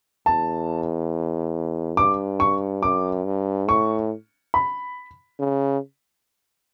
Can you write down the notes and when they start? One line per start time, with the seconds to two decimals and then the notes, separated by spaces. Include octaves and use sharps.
0.26 E2 A5
1.97 G2 D6
2.40 C#6
2.83 F#2 D6
3.26 G2
3.69 A2 C#6
4.54 B5
5.39 C#3